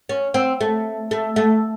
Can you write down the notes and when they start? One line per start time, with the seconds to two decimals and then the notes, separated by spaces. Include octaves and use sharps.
0.09 C#4
0.34 C4
0.61 A3
1.11 A3
1.36 A3